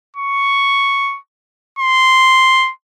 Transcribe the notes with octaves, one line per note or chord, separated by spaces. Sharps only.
C#6
C6